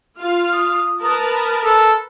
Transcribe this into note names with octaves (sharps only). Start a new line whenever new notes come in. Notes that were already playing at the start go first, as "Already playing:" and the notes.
F4 F5
D#6
A#4 B4 A5
A4